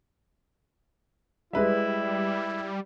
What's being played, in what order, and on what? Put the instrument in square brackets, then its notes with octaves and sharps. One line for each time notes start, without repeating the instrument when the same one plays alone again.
[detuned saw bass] G3 [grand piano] G#3 B4 E5 [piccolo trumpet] E4